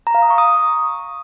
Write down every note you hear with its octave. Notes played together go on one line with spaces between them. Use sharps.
A#5
F5
D#6
C#6
D#6